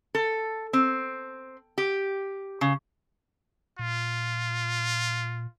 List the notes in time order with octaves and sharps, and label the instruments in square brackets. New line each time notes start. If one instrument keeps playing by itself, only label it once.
[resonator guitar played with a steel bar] A4
C4
G4
C#3
[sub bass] A#2 [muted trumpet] F4